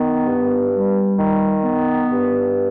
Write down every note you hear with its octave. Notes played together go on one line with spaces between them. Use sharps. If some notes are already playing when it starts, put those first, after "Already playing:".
Already playing: D#3 B3
G2
G3
D#3
B3
G2